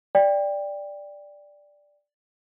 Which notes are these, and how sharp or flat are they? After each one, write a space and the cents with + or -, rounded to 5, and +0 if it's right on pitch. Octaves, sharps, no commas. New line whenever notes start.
D5 +0 G5 +15